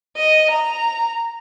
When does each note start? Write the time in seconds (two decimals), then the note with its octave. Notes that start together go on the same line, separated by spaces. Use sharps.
0.17 D#5
0.50 A#5